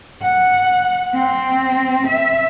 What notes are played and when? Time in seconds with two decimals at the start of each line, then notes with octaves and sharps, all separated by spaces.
0.22 F#5
1.15 C4
2.07 E5